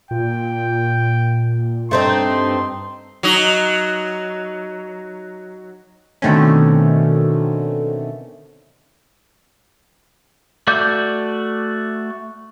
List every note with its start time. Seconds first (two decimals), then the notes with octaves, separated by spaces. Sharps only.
0.11 A#2 G5
1.91 G2 A3 C4 D#4 C6
3.23 F#3 D#4
6.22 B2 D3 D#3 A3 C4 C#4
10.67 A3 F#4 D5 D6 G6